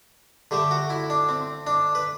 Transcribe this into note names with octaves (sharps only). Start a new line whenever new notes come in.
D3 A3 G4
F#4
E4
D4
C4
D4
B4